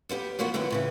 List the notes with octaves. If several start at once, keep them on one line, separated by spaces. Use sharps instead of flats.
A#3 B3 E4 G4
E2 F3 A#3 B3 F#4
F2 D3 D#3 B3 E4
A2 C#3 E3